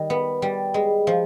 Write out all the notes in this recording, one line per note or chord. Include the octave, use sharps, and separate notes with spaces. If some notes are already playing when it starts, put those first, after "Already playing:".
Already playing: D#3 G3
B3
G3
G#3
F3